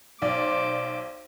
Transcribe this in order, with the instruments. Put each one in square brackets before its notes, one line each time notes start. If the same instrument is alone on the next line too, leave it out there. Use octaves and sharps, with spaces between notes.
[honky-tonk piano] B1 D5 [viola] C5 D6